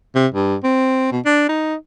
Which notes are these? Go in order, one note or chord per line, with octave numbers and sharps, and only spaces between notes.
C3
G2
C4
B2
D4
D#4